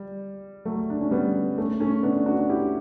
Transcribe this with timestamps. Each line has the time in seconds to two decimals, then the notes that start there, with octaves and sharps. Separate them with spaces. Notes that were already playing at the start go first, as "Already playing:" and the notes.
Already playing: G3
0.65 F#3 A3
0.90 D4
1.01 C#4
1.11 G3 B3
1.58 A3 C#4
1.80 A3 C#4
2.03 B3 D4
2.26 D4 F#4
2.49 E4 G4